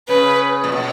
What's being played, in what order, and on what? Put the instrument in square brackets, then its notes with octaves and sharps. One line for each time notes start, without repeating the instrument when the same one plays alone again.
[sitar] C#3 [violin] B4
[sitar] A#2
B2